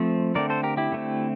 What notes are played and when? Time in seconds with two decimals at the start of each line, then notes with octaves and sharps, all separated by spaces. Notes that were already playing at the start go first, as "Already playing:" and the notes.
Already playing: F3 A3 C4
0.35 D3 A3 C4 A#4 D5
0.50 A4 C5
0.63 G4 A#4
0.77 E4 G4
0.92 D3 A3 C4